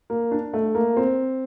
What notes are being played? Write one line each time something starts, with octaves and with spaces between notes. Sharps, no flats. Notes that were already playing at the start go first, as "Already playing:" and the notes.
A#3
D4
A3
A#3
C4